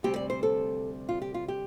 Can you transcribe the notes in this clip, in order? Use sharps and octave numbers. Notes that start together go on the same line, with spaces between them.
D2 C3 G3 C4 G4
D5
C5
A4
F4
G4
F4
G4